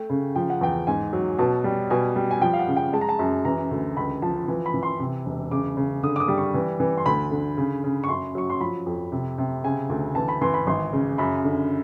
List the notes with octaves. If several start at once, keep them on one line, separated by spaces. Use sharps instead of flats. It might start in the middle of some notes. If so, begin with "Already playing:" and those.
Already playing: A3 G5
C#3
F3 G5
F#5
E2 G5
G#2 G#5
F#3
B2 A5
G3
B2 G#5
G3
G#5
F3 G5
F5
F#5
C#3
G5
G#3 A5
A#5
A5
F#2
E3 A#5
D2
C#2 B5
F3 A5
E3
B5
E3
C6
C3
E1
C#3 D6
C#3
D3 D#6
D6
D#6
G3
C#6
E3
E3
C6
D2 B5
D3
C#3
C#3
C#6
F#2 C6
F#3 C#6
C6
F3 B5
F2
C3
C3
C#3 G#5
D2
E3 A5
B5
E3 C6
B5
G#1 C6
C#3
F#2 B5
D3